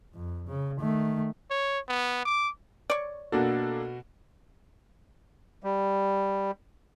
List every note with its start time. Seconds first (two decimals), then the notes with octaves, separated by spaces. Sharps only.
0.15 F2
0.47 C#3
0.80 D#3 A3
1.50 C#5
1.88 B3
2.25 D6
2.90 C#5 D5
3.32 B2 A#3 D4 F#4 A4
5.64 G3